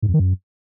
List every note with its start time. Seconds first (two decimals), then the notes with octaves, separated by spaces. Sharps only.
0.02 G#2
0.08 F2
0.14 D#3
0.19 F#2